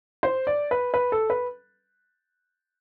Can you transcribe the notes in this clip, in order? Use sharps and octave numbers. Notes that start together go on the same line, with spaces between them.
C5
D5
B4
B4
A4
B4